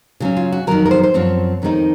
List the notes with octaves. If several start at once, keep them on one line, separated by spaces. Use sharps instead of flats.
C#3 F#3 C#4
F4
F#4
F2 C3 D#3 F#3 A#4
A#4
C5
C5
F#2 F3 C4 C#5
F2 D#3 G#3 C4 D#4